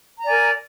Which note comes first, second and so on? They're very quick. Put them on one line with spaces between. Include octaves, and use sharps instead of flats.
A#5 D5 G#5 A#4